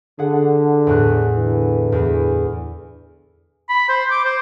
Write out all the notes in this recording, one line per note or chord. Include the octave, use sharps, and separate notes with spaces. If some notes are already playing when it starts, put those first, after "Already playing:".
D3 G#4 F#5
E2 A2 F#6
D3 E3
E2
B5
C5
D6
C5